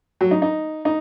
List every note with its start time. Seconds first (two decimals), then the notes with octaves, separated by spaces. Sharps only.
0.21 F#3
0.31 D#4
0.42 D#4
0.85 D#4